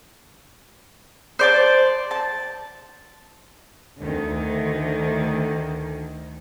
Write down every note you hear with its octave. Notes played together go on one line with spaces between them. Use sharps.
C5 D5 A5
A5
D2 D#3